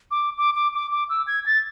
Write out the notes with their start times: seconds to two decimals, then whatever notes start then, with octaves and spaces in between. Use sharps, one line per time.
0.11 D6
0.38 D6
0.55 D6
0.74 D6
0.91 D6
1.09 E6
1.27 G#6
1.46 A6